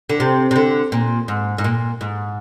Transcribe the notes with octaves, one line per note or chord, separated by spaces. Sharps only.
D3
C3
C3
D3
A#2
G#2
G#2
A#2
G#2